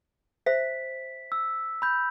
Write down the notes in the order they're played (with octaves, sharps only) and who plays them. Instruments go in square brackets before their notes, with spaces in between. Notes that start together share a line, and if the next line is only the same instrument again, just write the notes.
[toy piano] C5 E5 [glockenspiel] B6
[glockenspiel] E6
B5 G6